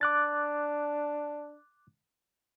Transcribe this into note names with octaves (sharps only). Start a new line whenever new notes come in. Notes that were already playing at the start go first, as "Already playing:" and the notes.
D4 D6 F#6 A6